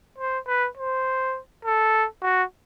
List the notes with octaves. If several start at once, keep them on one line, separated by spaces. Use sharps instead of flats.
C5
B4
C5
A4
F#4